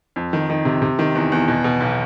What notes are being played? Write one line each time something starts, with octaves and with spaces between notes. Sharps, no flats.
F2
D#3
D#3
C3
C3
D#3
E2
E2
B2
B2
B1